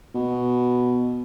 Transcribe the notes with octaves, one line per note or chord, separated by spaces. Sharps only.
B2